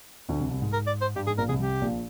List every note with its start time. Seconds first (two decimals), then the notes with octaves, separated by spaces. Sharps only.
0.29 D2 D3
0.40 C2 C3
0.51 C2 C3
0.62 G#2
0.73 A#4
0.87 D5
1.01 C5
1.16 G2 G4
1.27 G#2 G#4
1.38 A#1 A#2 A#4
1.49 C2 C3 G#4
1.60 C2 C3 G4
1.81 A#1 A#2